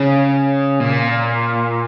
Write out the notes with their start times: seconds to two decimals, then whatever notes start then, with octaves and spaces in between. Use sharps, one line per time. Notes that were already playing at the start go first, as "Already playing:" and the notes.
Already playing: C#3
0.80 A#2